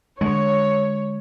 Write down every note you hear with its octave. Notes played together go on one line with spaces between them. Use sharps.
D3 G#3 C#5